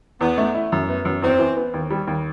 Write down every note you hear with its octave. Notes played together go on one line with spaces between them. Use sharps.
E2 B3
A3
E4
F#2
B3
F#2
E2 C4
E3
B3
D#2
G3
D#2